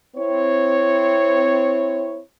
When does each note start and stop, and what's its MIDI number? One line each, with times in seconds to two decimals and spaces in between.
0.16 2.19 60
0.16 2.19 64
0.16 2.19 73